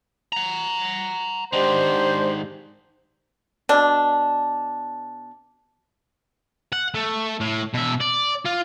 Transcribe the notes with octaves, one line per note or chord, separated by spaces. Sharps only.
F#5 A#5
G#2 D#3 D4 G4 C5
B2 D4
F#5
A3
A2
B2 E5
D5
F4